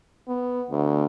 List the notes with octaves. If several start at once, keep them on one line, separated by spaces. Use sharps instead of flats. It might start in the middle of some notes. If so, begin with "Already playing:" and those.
B3
D2